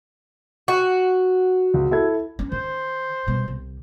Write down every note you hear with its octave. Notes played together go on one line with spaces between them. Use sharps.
F#4
C#2
E4 A4 G#6
C#4 D4
D#3 C5
B2 G3
C2